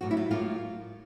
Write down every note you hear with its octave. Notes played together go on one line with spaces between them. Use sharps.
A2 F#3 A#3 F#4
E4
F4
A2 F#3 A#3 F4